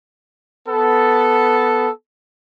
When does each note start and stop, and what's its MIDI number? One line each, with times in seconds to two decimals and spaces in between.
0.68 1.90 59
0.68 1.90 69